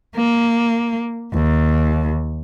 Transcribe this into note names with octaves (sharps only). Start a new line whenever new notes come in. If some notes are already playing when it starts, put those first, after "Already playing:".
A#3
D#2